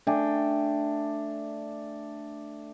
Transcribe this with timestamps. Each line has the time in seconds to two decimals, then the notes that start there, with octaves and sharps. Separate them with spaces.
0.07 A3 D4 G5 G#5